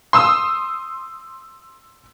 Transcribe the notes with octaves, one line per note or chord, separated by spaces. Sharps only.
C6 D#6 E6